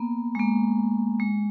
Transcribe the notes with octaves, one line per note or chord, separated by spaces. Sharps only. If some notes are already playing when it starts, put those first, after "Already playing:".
Already playing: A#3 B3
G#3
A#3
G#3